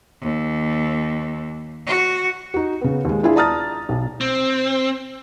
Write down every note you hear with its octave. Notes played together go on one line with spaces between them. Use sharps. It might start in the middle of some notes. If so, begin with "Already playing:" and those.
D#2
F#4
D#4 F#4
C#3 B3
D#2 G#3
D4 E4 F4 G#4 F5
D5 A5 A#5 D#6 F6 A6
B1
C4